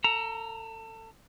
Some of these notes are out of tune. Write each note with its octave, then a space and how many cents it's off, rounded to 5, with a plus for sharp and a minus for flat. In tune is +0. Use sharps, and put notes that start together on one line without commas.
A4 +30 A#5 +0